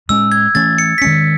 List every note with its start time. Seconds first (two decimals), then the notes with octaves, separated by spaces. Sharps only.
0.09 A2 G#3 C#4 E6
0.32 G#6
0.55 E3 A3 C#4 A6
0.78 C#7
0.98 B6
1.02 C#4 C#7
1.05 D#3 G#3